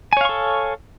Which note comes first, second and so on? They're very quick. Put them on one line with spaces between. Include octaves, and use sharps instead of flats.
G#5 C#5 F5 C#6 A4